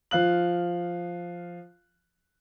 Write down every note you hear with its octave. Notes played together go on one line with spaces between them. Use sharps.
F3 F5 F#6 F#7